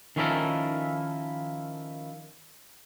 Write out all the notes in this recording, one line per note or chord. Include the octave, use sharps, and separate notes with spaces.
D#3 F3 C#4 E4 A4 A#4